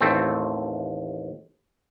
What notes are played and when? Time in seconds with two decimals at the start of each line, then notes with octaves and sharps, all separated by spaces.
0.01 A1 D#2 A3 C4